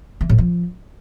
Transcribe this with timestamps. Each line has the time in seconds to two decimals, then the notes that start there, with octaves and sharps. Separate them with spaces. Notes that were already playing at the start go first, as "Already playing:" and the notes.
0.21 E3
0.29 A2
0.38 F3